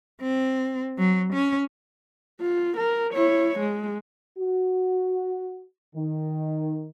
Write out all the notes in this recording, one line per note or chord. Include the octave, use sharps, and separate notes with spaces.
C4
F#3
C#4
F4
A#4
E4 C#5
G#3
F#4
D#3